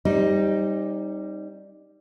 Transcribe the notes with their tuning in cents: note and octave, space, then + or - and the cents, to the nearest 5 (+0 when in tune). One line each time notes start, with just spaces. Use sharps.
G3 +0 C4 +45 D#4 +0